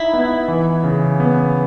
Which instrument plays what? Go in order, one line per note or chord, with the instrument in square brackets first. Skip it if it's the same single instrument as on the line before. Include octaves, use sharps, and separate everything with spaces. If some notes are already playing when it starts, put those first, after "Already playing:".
Already playing: [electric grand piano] D#4 [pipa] E4
[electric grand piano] B3
E3
C#3
B3